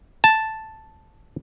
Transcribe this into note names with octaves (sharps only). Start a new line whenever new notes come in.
A5